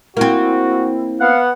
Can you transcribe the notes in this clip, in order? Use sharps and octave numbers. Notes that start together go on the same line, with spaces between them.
A#3 C4 E4 F#4
B3 F5 F#5